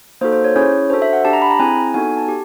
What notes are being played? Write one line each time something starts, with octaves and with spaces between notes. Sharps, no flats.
A#3 D#4 F#4 A4 C5
C5
C#5
C#4 E4 G#4 C#5
D4 F#4 A4 C5
E5
F#5
D4 G4 A5
A#5
B5
A#5
C4 E4 G#4 G#5
B3 D#4 F#4 A4 G#5
A5
G4